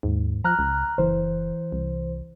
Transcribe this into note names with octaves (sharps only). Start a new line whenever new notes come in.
D#2 G#2
F3 A#5 F6 F#6
C#2
F#1 E3 C5
C2